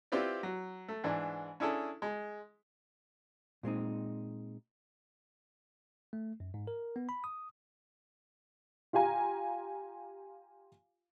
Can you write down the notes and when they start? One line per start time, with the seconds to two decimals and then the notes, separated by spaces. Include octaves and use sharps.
0.12 C4 E4 F4 G4 B4 D5
0.43 F#3
0.88 A3
1.04 G#2 E3 D4
1.60 C#4 D4 E4 G#4 A4
2.02 G#3
3.63 A#2 G#3 C4 D#4
6.13 A3
6.40 F#2
6.54 G#2
6.67 A#4
6.96 B3
7.09 B5
7.24 D#6
8.93 F4 G4 F5 G#5 A#5